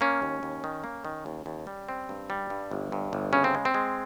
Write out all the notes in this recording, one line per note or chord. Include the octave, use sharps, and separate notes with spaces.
A#3 C#4
D#2
D#2
D#3
A#3
D#3
D#2
D#2
G3
C4
G2
G3
G2
G1
G2
G1
C#3 C#4
C4
G#3
C4
G#3